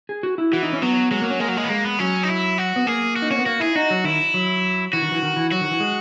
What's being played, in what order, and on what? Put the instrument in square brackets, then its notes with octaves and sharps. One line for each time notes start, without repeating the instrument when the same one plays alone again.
[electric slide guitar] G#4
F#4
E4
[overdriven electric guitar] E3 [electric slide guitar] F#4
[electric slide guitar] D#4
C#4
[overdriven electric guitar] F#3 [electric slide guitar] B3
[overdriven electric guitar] F#3 [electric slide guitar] G#3
[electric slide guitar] A#3
C#4
[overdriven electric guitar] G#3 [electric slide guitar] A#3
[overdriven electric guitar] F#3
G#3
B3
[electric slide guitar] G#3 [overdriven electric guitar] A#3
[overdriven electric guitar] B3
[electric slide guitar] F#3 [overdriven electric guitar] C#4
[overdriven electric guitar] D#4
E4
F#4
[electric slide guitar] B3
[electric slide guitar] A#3 [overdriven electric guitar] G#4
[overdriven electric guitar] F#4
[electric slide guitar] D#4
[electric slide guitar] C#4 [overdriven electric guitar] F#4
[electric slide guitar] B3
[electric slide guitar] A#3 [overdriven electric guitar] F#4
[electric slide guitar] E4 [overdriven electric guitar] G#4
[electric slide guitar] D#4 [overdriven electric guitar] F#4
[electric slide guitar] F#3
[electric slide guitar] D#3 [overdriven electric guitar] E4
[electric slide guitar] F#3
[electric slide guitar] E3 [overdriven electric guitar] F#4
[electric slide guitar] D#3
E3
D#3
E3
[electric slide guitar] F#3 [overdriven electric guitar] F#4
[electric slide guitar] D#3
E3
G#3